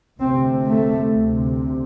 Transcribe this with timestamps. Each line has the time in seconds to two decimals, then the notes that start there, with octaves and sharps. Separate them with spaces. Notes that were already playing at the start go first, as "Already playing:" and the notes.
0.20 D2 C3 C4
0.69 A3
1.17 D2 C3